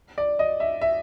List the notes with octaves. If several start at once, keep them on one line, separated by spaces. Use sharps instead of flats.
D5
D#5
E5
E5